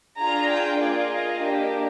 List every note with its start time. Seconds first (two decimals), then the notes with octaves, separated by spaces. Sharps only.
0.19 D4 F4 G#4 A#5
0.50 G5
0.79 A#3 F4 G#4 D5
1.09 D#5
1.39 A#3 D4 G4